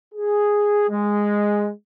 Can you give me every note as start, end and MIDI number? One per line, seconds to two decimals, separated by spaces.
0.14 0.87 68
0.89 1.70 56